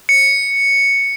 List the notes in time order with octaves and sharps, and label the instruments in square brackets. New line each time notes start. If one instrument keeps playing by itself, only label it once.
[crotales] C#7